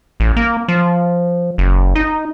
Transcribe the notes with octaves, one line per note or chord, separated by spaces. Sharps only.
A1
A#3
F3
F#1
D#4